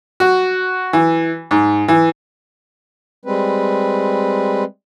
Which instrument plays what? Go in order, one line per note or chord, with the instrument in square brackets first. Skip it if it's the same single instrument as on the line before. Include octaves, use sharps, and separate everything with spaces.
[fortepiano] F#4
E3
G#2
E3
[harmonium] G3 G#3 C4 B4